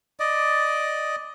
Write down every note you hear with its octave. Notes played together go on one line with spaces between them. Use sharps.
D5 D#5